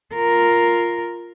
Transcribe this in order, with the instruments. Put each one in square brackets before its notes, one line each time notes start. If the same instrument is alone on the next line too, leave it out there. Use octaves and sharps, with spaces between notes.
[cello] F4 A#4